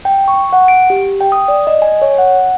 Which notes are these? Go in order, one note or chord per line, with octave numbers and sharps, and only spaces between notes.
G5
C#6
F#5
D7
G4
G5
D#6
D5
D#5
G#5
C#5
F#5